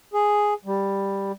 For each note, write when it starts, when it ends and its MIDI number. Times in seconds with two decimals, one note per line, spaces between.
0.13 0.54 68
0.65 1.32 55